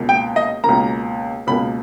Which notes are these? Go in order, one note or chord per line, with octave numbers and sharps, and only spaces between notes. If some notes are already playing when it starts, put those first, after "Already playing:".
Already playing: C#2 B2 A#3
G5
D#5
C#2 B2 A#3 A#5
C#2 B2 A#3 B5